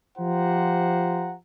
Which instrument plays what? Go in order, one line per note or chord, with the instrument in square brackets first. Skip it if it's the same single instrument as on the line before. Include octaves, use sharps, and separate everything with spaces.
[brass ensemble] F3 F4 G4 C5 F#5 A#5